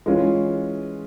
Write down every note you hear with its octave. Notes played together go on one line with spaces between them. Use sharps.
E3 G#3 C#4 F4